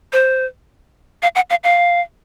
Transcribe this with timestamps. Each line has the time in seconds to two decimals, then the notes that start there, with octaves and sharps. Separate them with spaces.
0.13 C5
1.22 F5
1.35 F#5
1.50 F5
1.64 F5